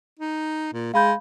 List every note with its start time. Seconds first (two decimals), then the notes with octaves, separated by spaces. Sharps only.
0.19 D#4
0.73 A#2
0.94 G#3 F5 B5 G6